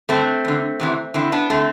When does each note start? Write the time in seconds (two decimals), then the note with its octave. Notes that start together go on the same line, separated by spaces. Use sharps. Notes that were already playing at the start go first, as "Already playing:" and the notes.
0.09 G2 D3 A3 C4
0.45 E2 D3
0.80 E2 C3 E3
1.14 E2 D3 C4 E4
1.32 B3 D4
1.50 D3 A3 C4